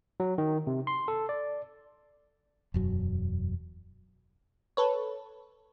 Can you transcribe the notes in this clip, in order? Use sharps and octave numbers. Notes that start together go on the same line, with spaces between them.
F#3
D#3
C3
C6
A4
D5
E1 F#2 F#3
A4 B4 C#5